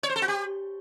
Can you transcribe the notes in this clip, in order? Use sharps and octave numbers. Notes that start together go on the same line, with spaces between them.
C#5
C5
A4
F#4
G4